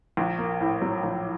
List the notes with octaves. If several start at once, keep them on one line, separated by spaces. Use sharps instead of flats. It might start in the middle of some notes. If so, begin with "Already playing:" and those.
A#1
A#3
A2
F#3
A#1